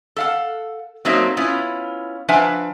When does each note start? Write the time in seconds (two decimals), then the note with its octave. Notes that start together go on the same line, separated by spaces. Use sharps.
0.16 A4 F5 F#5
1.05 F#3 A3 A#3 C4 D#4 E5
1.37 B3 C#4 E4 F4
2.28 F3 D4 B4 E5 F#5 G#5